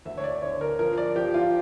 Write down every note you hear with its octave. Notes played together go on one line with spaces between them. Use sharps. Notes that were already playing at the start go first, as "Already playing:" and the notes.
D2 E5
C#5
D5
D3 C#5
A#4
F3 A#4
D5
F3 G4
F4